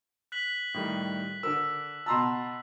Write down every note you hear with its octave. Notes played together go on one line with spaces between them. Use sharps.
F#6 B6 F#7
A2 D#3 G3
D3 A#4 E6
B2 A5 A#5 C6 E6